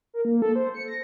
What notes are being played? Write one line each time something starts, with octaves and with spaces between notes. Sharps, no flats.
A#4
A#3
A4
C5
C#7
A#6